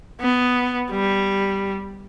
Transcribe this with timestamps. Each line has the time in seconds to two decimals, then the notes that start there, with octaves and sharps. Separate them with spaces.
0.21 B3
0.91 G3